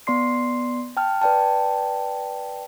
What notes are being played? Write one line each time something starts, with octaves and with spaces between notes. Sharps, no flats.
B3 D5 C6 C7
G5 A5 F6
B4 D5 G5 A5